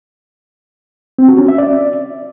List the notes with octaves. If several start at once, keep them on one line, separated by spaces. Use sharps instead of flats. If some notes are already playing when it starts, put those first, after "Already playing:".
C4
F#4
C#4
E5
D5